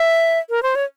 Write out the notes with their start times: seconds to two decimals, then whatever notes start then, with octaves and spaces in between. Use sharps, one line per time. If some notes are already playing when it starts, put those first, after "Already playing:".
Already playing: E5
0.50 A#4
0.63 C5
0.75 C#5